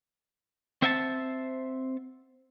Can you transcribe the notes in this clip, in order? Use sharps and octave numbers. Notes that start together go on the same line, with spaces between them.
C4 C5 E5 F#5 G5 A5